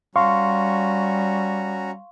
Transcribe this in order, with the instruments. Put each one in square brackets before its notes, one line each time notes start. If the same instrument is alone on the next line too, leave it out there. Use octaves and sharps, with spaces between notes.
[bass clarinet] G3 [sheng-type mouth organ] C#4 F#4 A#5 [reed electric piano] F5 C6 C#6